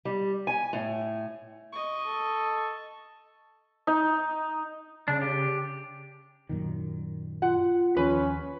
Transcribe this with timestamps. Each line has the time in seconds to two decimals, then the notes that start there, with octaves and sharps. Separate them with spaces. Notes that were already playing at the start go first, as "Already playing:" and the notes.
0.05 G3
0.47 G#5
0.73 A2
1.73 D#5 C#6
2.06 A4
3.87 D#4
5.08 C#3 D4
5.21 G4
6.49 F#2 A#2 D#3
7.42 F4 F#5
7.97 D#2 F3 C#4 B4